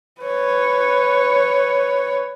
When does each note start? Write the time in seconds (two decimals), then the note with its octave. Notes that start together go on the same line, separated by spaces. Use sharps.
0.21 B4 C#5